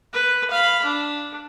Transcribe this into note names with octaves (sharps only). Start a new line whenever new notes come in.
B4
F5 B5
D4